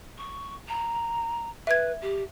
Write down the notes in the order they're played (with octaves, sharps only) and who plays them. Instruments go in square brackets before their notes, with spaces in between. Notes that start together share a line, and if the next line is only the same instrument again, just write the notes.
[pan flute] C#6
A#5
[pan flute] B4 [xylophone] E5 G#6
[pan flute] G4